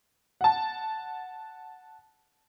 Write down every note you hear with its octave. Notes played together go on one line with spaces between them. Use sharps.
F#5 A5